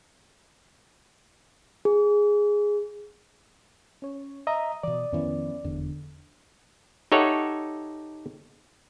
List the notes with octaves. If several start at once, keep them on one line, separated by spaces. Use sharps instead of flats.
G#4
C#4 C#5
D#5 E5 A#5 D#6
B2 E3 D5
F2 D#3 F3 B3 C#4 E4
F1 E2 D3
D#4 G4 A4 C#5 E5 F#5